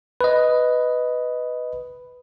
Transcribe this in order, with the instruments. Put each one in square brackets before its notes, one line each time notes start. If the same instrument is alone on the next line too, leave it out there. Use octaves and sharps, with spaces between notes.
[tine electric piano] B4 D#5